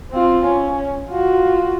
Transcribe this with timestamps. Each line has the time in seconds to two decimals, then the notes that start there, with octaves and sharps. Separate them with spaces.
0.11 C4 F4
0.46 C#4
1.09 F4 F#4